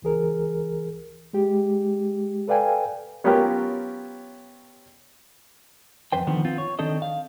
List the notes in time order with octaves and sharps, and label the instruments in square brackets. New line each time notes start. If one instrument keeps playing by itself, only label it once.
[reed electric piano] C#2 E3 G#4 A#4
G#3 G4
A4 B4 D5 F5 G5 G#5
[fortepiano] F#3 B3 C#4 F4 G4 A#4
[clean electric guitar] F2 B4 C5 G5
D3 D#3 F3 B3
B3 C4 F4
C#5
D#3 C4 D4 A4 D#5
F5